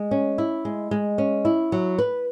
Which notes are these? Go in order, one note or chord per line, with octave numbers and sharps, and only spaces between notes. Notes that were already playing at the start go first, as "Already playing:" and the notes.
Already playing: G#3
C#4
E4
G#3
G#3
C#4
E4
F#3
B4